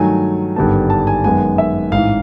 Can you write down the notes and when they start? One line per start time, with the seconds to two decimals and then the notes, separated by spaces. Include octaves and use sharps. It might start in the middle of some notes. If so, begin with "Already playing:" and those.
Already playing: G2 D#3 F#3 A3 G#5
0.56 G#1 G2 D3 G3 B3 A5
0.90 A5
1.07 G#5
1.24 F#2 D#3 G#3 B3 G#5
1.58 E5
1.92 A1 G#2 E3 F5